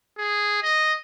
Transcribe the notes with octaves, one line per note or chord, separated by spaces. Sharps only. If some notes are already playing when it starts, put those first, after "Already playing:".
G#4
D#5